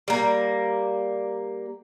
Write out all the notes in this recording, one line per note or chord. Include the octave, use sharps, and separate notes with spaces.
G3 A#3